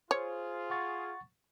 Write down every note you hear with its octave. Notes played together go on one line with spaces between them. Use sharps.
F4 G#4 C5 C#5
F#5 C#6 A6